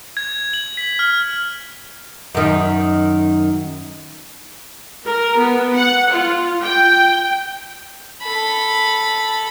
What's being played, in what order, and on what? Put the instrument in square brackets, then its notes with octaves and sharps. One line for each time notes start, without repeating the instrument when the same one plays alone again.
[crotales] G#6
F#7
B6
F6
[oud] F#2 D#3
[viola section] A#4
B3
F#5
F4
G5
[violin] A4 B5